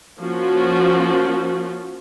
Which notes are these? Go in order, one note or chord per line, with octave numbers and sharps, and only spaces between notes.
F3 A#3 C#4 F4 F#4